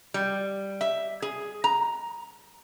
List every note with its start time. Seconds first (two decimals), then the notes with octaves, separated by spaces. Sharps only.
0.14 G3
0.81 E5
1.22 G#4
1.64 A#5